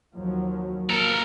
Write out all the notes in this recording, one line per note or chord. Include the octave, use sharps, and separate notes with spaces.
D#2 F3 F#3
A#3 A4 A#4